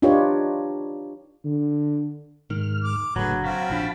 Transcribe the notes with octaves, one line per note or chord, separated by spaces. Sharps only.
D4 D#4 F4 G4 B4 C#5
D3
G#2 D#3 F6
D6
F#1 A2 D3 F#3 G#4 B4
C4 F#4 F5 A5 B5
A#1 F3 D4